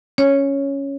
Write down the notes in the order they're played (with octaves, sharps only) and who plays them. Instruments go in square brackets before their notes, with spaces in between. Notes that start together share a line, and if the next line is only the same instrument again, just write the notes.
[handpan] C#4 [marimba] C#5